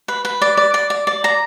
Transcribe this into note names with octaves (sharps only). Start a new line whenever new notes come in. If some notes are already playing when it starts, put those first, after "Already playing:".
B4
B4
D5
D5
D5
D5
D5
A#5